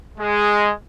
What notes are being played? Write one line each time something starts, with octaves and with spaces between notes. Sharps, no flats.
G#3